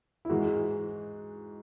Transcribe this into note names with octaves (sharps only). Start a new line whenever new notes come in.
E4
G#2 E3 G#3 F#4